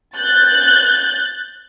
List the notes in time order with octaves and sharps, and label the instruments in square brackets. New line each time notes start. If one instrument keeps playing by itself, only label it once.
[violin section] F#6 G6 A6